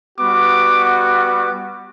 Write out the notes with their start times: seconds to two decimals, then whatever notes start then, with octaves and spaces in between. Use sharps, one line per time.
0.19 G3 B3 F#4 D6
0.84 D6